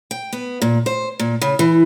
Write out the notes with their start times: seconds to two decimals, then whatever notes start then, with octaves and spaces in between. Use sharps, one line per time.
0.11 G5
0.33 B3
0.62 A#2
0.86 C5
1.20 A#2
1.42 C#3
1.59 E3